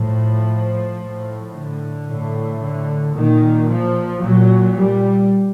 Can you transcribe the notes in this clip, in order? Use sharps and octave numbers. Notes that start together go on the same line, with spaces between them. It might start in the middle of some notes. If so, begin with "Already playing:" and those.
Already playing: A2 F3
A2
D3
A2
D3
A#2 D#3
F3
A#2 F#3
G3